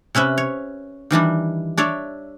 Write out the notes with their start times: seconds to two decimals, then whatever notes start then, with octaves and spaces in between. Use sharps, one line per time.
0.15 C3 C#4 B4 E5
0.38 C#5
1.11 D#3 E3 G3 D4
1.78 D4 C#5 D5 E5